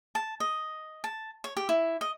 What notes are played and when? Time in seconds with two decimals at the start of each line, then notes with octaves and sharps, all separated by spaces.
0.15 A5
0.40 D#5
1.04 A5
1.44 C#5
1.57 G4
1.69 E4
2.01 D#5